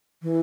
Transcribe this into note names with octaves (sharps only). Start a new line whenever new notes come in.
E3